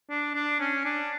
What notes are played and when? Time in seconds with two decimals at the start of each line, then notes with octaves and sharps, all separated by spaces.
0.10 D4
0.35 D4
0.59 C#4
0.85 D4